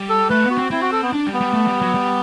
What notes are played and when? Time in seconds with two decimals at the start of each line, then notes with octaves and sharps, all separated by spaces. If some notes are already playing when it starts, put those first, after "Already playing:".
Already playing: G3
0.10 A4
0.30 A3 B4
0.44 B3
0.50 F#4
0.58 C4
0.71 C4 E4
0.81 F#4
0.92 A4
1.02 B3
1.13 D4
1.27 G3
1.34 B3
1.41 G3
1.54 A3
1.68 G3
1.82 F#3
1.94 G3